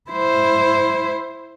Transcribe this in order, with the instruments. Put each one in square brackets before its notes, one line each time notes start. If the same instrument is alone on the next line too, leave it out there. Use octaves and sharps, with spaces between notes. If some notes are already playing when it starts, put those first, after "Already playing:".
[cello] E4 C5